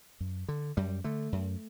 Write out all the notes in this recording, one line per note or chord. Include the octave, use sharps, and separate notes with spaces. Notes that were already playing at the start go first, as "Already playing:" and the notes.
F#2
D3
F#2 G3
D3 A3
F#2